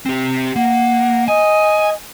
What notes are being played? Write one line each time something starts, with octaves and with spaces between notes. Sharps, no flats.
C4 G4
A#3 F#5
D#5 G#5